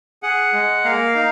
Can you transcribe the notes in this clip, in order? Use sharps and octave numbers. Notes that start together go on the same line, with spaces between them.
G#4 F#5
G#3
A#3 F5
D#4